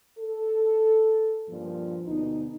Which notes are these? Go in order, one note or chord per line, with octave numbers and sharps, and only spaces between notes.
A4
G2 A#2 F3
D2 B2 D#4